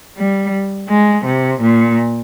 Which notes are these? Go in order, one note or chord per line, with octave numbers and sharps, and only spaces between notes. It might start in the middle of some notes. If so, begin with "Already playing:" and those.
G3
G#3
C3
A#2